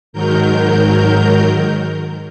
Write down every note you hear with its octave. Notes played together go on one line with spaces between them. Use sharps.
G#2 D#3 F#3 A#4 G6